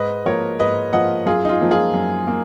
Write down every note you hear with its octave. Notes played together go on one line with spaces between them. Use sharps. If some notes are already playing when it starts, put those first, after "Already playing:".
Already playing: G#2 B4 D#5
F3 A#3 A#4 C#5
G#2 B4 D#5
F3 A#3 D#5 F#5
F#2 F4 G#4
D#4
F4
F3 A#3
F4 G#4
F#2
A#3